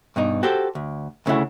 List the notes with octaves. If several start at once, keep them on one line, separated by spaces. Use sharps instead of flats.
G2 B2 D#4
F#4 G4 A4 C5
D2
D2 C#3 A3 E4 F#5